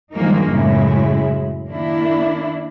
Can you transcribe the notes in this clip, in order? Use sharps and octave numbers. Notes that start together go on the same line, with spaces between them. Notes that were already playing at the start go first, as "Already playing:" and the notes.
G2 D#3 F3 G#3 A#3 D#4
F#2 A2 C#3 G#3 E4
D#3 A#3 D4 E4